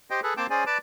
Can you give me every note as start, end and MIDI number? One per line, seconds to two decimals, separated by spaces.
0.10 0.20 67
0.10 0.20 72
0.10 0.20 75
0.10 0.20 79
0.23 0.34 68
0.23 0.34 69
0.23 0.34 71
0.37 0.47 58
0.37 0.47 60
0.37 0.47 79
0.37 0.47 81
0.37 0.47 86
0.50 0.64 61
0.50 0.64 68
0.50 0.64 72
0.50 0.64 74
0.50 0.64 80
0.66 0.78 71
0.66 0.78 74
0.66 0.78 81
0.66 0.78 86